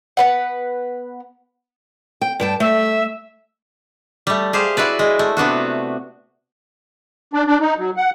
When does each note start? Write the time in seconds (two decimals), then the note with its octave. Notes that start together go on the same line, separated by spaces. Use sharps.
0.17 B3 B4 F#5
2.21 G5
2.40 G2 G5 A5
2.60 A3 E5
4.27 G3 A3
4.53 G4 G#4 C5 F5
4.77 E4 F#4 B4 D5
4.99 G#3
5.19 A3
5.37 C3 B3 D4 F#4
7.33 D4
7.47 D4
7.60 D#4
7.78 F#3
7.97 F#5